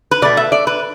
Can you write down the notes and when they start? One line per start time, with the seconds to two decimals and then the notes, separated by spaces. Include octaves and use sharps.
0.11 B4
0.22 B2 A3 D5
0.37 E5
0.52 D5
0.67 B4